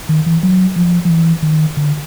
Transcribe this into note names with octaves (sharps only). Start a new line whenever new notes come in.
D#3
E3
F#3
F3
F3
E3
D#3
D3